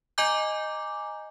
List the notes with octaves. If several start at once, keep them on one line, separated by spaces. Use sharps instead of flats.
D#5 G#5 A#5 D6 G6